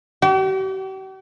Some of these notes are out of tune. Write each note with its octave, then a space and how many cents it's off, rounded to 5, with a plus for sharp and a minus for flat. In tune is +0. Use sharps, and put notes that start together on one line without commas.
G4 -45